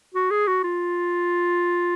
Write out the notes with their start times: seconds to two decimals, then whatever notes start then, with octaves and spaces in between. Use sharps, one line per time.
0.14 F#4
0.31 G#4
0.47 F#4
0.64 F4